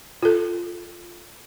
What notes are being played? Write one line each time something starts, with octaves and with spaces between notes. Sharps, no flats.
F4 A4